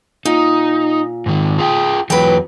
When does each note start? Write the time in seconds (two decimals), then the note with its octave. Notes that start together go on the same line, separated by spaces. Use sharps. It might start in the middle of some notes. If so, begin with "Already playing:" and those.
0.25 A#2 D#4
1.26 G#2 D#3
1.59 F4 G#4 G5
2.10 E2 E3 F#3 B4 G5